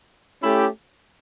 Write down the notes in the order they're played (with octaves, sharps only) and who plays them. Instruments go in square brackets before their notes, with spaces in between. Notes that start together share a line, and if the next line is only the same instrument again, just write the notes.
[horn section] A3 C#4 E4 G4